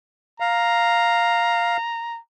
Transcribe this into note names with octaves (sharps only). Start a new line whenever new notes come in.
F5 A#5